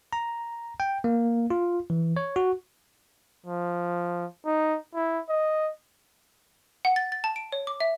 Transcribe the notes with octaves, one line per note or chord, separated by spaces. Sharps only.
A#5
G5
A#3
F4
E3
C#5
F#4
F3
D#4
E4
D#5
F#5
A6
A6
A5
D7
C#5
D6
E5